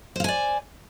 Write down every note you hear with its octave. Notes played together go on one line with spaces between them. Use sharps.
C5 D5 F5 G#5